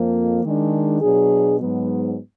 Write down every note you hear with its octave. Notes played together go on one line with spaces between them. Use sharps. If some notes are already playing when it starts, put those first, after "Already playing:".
Already playing: F2 F3 A#3
D#3 G#3 D4
B2 F#3 D4 G#4
G#2 F#3 B3